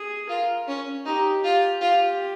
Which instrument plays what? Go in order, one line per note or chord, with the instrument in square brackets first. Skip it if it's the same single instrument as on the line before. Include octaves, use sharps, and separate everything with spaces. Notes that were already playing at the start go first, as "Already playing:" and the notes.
Already playing: [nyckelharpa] G#4
[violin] F4 [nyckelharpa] A#4
[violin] C#4
[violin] D#4 [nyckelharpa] G4
[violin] F4 [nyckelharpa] G4
[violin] F4